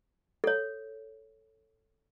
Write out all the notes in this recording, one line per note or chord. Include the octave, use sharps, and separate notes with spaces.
A4 C#5